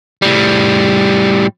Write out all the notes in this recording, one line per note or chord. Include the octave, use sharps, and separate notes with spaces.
A2 G3